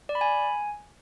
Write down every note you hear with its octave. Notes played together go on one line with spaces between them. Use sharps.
D5
B5
G#5